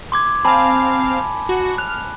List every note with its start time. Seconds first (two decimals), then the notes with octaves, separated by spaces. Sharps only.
0.12 C6 D6 G#6
0.45 C4 F5 G#5 A5 B5
1.49 F#4
1.78 F6 F#6